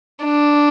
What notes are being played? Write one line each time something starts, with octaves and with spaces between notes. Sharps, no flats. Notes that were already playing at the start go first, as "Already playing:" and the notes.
D4